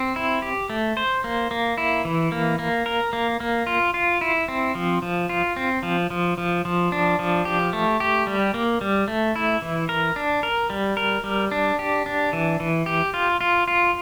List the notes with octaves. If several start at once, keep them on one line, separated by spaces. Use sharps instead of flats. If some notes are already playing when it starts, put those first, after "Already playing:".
Already playing: C4
E4
G4
A3
C5
A#3
A#3
E4
E3
A#3
A#3
A#4
A#3
A#3
F4
F4
E4
C4
F3
F3
F4
C4
F3
F3
F3
F3
D4
F3
G4
A3
G4
G3
A#3
G3
A3
E4
E3
A#4
D4
A#4
G3
A#4
G3
D4
G4
D4
E3
E3
G4
F4
F4
F4